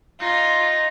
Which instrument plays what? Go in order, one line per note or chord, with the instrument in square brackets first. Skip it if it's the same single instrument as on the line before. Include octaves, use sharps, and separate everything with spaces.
[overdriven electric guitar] D#4 [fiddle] F4 [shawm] A#5